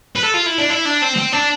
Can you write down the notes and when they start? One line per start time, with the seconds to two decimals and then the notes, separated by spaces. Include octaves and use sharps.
0.16 B4
0.23 A4
0.34 F4
0.46 E4
0.58 D4
0.70 E4
0.85 D4
1.02 C4
1.17 C4
1.33 D4